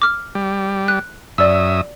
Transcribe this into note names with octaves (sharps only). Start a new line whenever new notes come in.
D6 F6
G3
F#6
F#2 D5 E5 D#6 E6